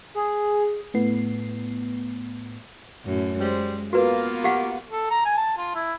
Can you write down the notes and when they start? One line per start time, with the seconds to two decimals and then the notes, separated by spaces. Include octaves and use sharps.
0.15 G#4
0.94 A2 B3 C7
3.05 F#2 A2
3.38 G3 G#3 C5
3.93 A#3 B3 F4 F#4 B4
4.44 G4 F5 F#5
4.91 A4
5.11 A#5
5.25 G#5
5.37 A5
5.57 F4
5.74 E4